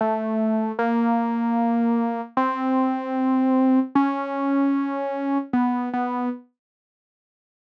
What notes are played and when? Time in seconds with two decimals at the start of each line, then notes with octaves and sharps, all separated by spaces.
0.01 A3
0.79 A#3
2.37 C4
3.95 C#4
5.53 B3
5.94 B3